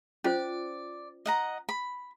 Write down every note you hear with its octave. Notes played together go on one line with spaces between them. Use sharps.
C#4 F4 C5 D5
D#5 F#5 A#5
B5